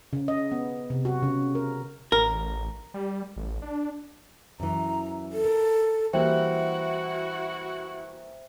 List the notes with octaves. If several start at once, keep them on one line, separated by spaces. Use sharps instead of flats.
C#3
D#5
B3
C3
F#4
C#3
A#4
A1 A#4
G3
A1
D4
F#2 E3 A#5
A4
A#4
E3 G3 A#3 E4 F#4 C5 E5 G5